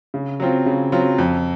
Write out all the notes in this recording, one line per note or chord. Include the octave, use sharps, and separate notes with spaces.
C#3
F#3 C4 F4
C#3
F#3 C4 F4
F2